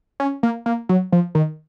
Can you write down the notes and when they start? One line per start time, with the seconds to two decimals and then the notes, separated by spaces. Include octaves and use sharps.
0.20 C#4
0.43 A#3
0.66 A#3
0.89 F#3
1.12 F3
1.35 D#3